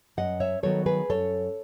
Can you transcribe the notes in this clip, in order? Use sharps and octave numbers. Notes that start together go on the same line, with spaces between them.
F#2 D#5 F#5
C#5 E5
D#3 F#3 B3 A4 C#5
G#4 B4
F#2 A4 C#5